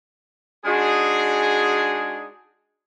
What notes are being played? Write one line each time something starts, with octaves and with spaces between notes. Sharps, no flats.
G#3 D4 D#4 F#4 G#4